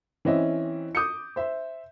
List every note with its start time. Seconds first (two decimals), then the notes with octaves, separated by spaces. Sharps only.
0.25 E3 C4 C#4 D#5 E5
0.95 D6 D#6 G6 C#7
1.36 C5 E5